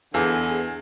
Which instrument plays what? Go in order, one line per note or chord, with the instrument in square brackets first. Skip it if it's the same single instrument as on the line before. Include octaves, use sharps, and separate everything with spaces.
[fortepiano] E2 [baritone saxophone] D3 [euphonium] B3 [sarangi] G#4